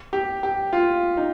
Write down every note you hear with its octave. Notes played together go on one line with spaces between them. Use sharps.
G4
G4
F4
D#4